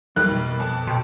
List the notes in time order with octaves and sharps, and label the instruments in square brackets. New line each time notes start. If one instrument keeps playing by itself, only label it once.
[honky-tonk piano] F1 G3 A#3 [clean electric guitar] E3 F#3 D#4 [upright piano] F#6
[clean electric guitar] B2
[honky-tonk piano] F2 A5
[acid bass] B2 [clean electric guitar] G5 C6